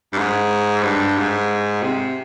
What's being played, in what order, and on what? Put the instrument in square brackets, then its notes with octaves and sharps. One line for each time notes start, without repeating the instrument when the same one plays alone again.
[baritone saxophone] G2
G#2
G2
G#2
C3